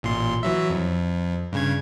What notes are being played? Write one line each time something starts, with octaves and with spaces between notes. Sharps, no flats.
A1 A#2 C6
E3 F#3 E5
F2
G2 C#3 G#6